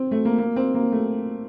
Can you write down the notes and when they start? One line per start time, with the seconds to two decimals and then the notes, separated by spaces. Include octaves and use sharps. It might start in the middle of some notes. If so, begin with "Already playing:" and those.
Already playing: C4
0.11 A3
0.25 A#3
0.38 A#3
0.56 C4
0.74 A#3
0.92 A3